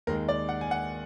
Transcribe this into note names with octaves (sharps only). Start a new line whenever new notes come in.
D#2 D#3 G#3 A#4
D5
F#5
G#5
F#5